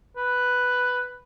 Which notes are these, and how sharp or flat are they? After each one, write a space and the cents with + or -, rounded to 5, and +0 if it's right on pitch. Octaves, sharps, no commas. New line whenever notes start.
B4 +5